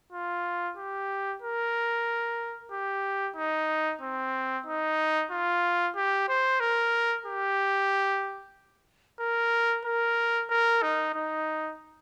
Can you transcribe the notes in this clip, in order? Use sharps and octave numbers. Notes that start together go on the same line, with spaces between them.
F4
G4
A#4
G4
D#4
C4
D#4
F4
G4
C5
A#4
G4
A#4
A#4
A#4
D#4
D#4